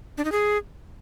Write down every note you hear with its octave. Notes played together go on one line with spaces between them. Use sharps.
D4
D#4
G#4